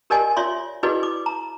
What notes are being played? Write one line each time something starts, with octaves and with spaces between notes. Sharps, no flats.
G4 A#4 D5 D#5 G#5
F4 C#5 D5 E5 C6
E4 F#4 G#4 B4 D5 D#5
D6
A#5